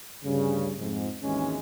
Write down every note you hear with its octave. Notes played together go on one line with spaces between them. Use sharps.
D2 G2 C#3
F2 G#2
G#1 D#2 E3 G#3 C#4